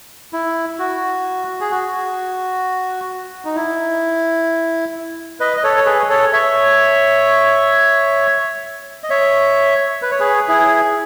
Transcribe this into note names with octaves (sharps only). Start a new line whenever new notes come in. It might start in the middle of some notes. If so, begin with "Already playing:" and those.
E4
F#4
G#4
F#4
D#4
E4
B4 D#5
D#5
A4 C#5
C#5
G#4 B4
A4 C#5
C#5 E5
D#5
C#5 E5
B4
C#5
G#4 B4
E4 G#4